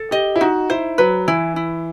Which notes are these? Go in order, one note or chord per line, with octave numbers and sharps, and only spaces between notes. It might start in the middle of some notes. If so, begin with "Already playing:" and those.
Already playing: A4
G4 D#5
E4
D#4 F#4
E4 C5
F#3 B4
E3 E4
E4